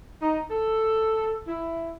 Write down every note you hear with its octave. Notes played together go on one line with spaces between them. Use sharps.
D#4
A4
E4